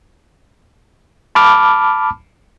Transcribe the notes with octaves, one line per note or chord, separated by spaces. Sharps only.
A5 B5 D6 F6